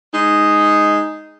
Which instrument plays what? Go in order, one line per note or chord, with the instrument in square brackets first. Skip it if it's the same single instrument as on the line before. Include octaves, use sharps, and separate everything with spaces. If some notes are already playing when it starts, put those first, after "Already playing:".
[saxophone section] G#3 D#4